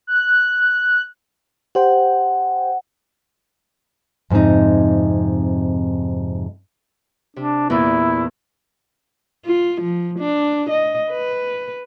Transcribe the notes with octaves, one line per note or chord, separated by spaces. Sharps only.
F#6
G4 C5 F#5 G5
F2 G#2 C3 C4 D#4
C3 D4
E2 A#2 E4
F4
F3
D4
D#5
B4